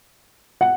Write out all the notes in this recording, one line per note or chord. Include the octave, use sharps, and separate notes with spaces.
F#5